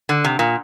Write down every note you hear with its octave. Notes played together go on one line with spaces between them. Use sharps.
D3
C3
A#2